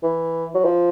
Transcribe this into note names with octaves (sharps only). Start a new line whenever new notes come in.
E3
F#3
F3